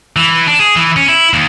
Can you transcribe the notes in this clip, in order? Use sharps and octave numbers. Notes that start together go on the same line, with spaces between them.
E3
D4
G#4
E3
C#4
E4
D#2